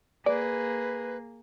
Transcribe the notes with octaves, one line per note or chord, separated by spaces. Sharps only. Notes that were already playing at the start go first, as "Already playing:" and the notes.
A#3 G#4 B4 D5